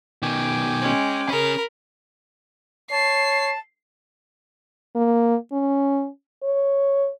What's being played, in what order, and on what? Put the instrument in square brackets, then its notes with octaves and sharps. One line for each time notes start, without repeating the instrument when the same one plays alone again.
[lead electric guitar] B2 D#3 [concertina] G5 G#5 D6
[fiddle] G#3 C#4
[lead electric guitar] C#4 G#4 [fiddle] A#4 B5
[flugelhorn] C#5 [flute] A5 [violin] C7
[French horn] A#3
C#4
C#5